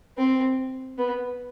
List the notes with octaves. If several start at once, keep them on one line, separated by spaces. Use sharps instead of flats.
C4
B3